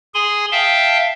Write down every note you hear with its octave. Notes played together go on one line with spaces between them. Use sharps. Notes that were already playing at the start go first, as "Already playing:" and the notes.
G#4 G#5 C6
E5 F5 G5 A5